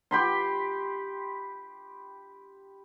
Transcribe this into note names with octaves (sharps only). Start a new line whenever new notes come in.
G4 B5 C6